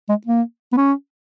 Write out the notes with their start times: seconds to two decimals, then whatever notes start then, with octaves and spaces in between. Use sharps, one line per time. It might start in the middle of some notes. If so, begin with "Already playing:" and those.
0.09 G#3
0.26 A#3
0.72 B3
0.77 C#4